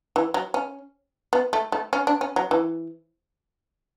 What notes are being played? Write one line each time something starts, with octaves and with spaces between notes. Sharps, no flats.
E3
F#3
C#4
B3
A3
A3
C#4
D4
C#4
F#3
E3